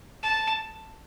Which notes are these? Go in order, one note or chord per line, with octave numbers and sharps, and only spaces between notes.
A5